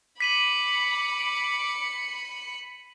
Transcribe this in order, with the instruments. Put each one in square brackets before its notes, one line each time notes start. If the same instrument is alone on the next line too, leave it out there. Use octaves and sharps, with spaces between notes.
[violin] B5 C#7 [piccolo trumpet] D6 [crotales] B6 D#7 F#7